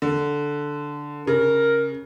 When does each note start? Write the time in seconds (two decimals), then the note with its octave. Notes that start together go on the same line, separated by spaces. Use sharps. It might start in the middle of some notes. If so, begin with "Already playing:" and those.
0.02 D3
1.27 C#3 A#4